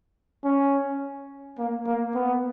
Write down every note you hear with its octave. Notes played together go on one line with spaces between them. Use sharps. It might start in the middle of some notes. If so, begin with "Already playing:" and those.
C#4
A#3
A#3
B3